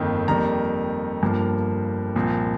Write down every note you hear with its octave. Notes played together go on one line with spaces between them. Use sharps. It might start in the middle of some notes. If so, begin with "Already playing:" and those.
Already playing: G1 F2 D#3 A#3
F2 D#3 G3 A#3 A#5
G1 G2 F3 A#3
C2 A#2 F3 A#3